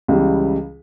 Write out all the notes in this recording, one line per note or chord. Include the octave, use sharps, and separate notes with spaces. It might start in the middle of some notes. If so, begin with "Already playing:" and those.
C#2 C#3 E3 G3